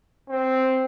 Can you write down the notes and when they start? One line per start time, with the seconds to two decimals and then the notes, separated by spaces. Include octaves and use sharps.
0.29 C4